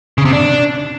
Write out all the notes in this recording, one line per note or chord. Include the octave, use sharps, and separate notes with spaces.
C#3
C3
D4